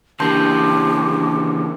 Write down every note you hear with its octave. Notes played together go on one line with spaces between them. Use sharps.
C#3 E3 A#3 D4 G4 A5 C6 G6